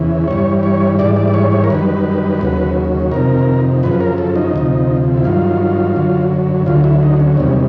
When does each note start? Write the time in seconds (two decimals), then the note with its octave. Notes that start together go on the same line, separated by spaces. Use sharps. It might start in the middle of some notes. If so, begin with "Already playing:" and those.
Already playing: E2 C#3 E3
0.28 G2 E3 G3 C#5
0.63 C#5
0.99 G#2 E3 G3 D5
1.17 D5
1.28 D5
1.34 C#5
1.52 C#5
1.64 A#4
1.70 F#2 D#3 G3 B4
2.41 D#2 C#3 F#3
3.11 F2 C3 D#3 A#4
3.83 F#2 C#3 F3 B4
4.01 A#4
4.18 A4
4.36 D#4
4.53 D2 C3 F3
5.18 E4
5.24 G2 D#3 F#3 F4
5.96 F#2 D3 F#3
6.66 D2 D3 F#3 F4
6.84 E4
7.03 D#4
7.20 C#4
7.37 E2 C3 D#3 G3 C#4